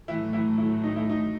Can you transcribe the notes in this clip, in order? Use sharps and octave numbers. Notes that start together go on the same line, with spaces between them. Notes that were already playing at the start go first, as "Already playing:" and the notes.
A2 E3 F#3 A3 E4
E3 E4
E3 E4
D#4
E4
D#4